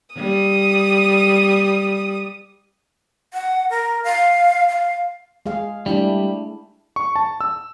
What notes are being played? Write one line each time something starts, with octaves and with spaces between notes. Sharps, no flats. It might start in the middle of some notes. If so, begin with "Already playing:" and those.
G3 D#6
F#5
A#4
F5
F5
G#3 G#4 F5
G3 A3 D4 E4
C#6
A5
E6